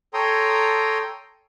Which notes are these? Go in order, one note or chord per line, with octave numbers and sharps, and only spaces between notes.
A4 C#5 G5 A#5 C6 D#6